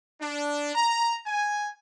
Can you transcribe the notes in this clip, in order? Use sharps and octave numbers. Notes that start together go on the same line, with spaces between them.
D4
A#5
G#5